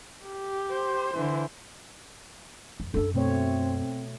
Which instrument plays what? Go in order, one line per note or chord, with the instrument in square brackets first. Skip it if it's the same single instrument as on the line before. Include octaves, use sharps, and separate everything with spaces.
[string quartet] G4
[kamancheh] C5 C6
[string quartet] D3 E3
[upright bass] F2
[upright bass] F#2 D4 [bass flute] A4
[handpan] B2 A3 C#5 [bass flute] C4